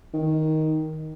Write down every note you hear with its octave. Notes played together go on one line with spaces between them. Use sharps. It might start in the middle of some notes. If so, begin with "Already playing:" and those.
D#3